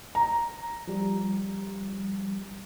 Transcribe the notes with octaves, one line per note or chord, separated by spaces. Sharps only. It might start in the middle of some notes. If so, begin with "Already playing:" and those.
A#5
F3 G3